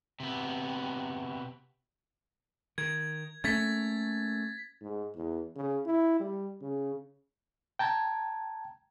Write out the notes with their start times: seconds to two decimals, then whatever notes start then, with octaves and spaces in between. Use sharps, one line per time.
0.20 C3 B3
2.78 D#3 G#6
3.44 A3 A#3 C#4 G#6 A6 B6
4.81 G#2
5.16 E2
5.56 C#3
5.86 E4
6.20 G3
6.61 C#3
7.79 G5 A5 A#5 G#6